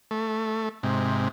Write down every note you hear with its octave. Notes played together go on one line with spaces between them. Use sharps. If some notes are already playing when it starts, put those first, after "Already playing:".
A3
G#2 C3